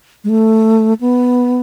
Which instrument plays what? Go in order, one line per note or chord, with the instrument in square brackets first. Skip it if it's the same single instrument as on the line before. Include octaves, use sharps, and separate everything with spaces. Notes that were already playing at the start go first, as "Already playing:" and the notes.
[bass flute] G#3
A3
B3